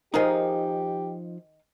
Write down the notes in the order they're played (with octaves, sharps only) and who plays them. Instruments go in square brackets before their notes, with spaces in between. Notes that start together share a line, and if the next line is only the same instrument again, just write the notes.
[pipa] D#3 G#4 A#4 [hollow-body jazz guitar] F3 D#4 [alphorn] G4